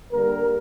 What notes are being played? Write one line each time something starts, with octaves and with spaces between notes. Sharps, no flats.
D3 G3 A#3 A#4